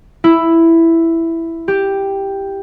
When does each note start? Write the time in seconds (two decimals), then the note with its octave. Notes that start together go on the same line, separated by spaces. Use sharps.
0.24 E4
1.68 G4